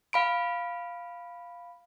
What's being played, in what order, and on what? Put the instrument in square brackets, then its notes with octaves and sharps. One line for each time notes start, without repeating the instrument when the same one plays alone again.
[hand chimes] F5 B5 D7